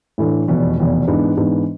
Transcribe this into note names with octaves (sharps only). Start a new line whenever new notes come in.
A2 E3 A3 D4
F1 E2 B2
F1 E2 B2
G#2 E3 B3 D4
G#2 E3 B3 D4